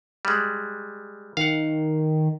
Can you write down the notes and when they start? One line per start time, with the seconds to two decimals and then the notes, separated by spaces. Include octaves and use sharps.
0.25 G3 G#3
1.37 D#3 F5 F#5